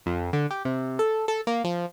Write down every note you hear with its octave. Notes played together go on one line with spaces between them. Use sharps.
F2
D3
G4
C3
A4
A4
A#3
F3